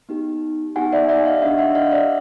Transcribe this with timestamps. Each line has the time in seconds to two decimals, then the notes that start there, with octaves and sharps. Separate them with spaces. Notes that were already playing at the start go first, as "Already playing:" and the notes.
0.09 B3 D#4 G4
0.76 B3 D#4 G4 F#5 G#5
0.93 D5 E5
1.09 D5 E5
1.25 D#5 F5
1.42 D4 G4 E5 F#5
1.58 E5 F#5
1.75 D#5 F5
1.92 D5 E5